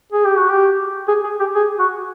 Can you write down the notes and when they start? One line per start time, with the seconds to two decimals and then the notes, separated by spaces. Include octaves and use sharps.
0.12 G#4
0.25 G4
0.37 F#4
0.49 G4
1.08 G#4
1.24 G#4
1.40 G4
1.55 G#4
1.79 F#4